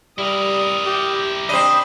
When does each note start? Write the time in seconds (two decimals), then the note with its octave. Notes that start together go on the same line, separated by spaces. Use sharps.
0.18 G3 E4 A#4 D#6
0.86 G4
1.49 C4 D4 D#5 B5